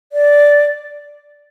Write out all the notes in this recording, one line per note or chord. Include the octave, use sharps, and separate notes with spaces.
D5